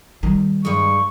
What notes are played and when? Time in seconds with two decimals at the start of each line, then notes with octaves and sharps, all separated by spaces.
0.23 D#3 G3
0.65 G2 G#3 C#6